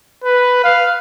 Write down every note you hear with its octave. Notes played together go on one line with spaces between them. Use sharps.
B4
F5